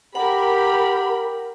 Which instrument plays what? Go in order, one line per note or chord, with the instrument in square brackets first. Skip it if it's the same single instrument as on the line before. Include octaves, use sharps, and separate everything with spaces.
[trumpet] G4 [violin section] A#4 B5 [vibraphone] F#5